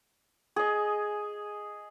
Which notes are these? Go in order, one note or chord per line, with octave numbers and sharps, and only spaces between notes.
G#4 D#5